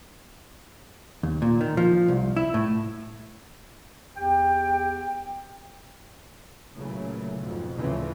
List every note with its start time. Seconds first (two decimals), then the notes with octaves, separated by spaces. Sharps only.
1.23 D#2
1.42 A#2
1.61 D#3
1.77 F3
2.08 C2
2.37 E4
2.54 A2
4.17 E2 G4 G5
6.74 A#2 C#3 E3 F#3 A3
7.39 F2 G#2 B2
7.77 D2 A2 C#3 E3 F3 C4